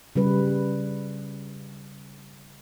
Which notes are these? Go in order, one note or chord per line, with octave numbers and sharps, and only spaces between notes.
C#3 G3 B4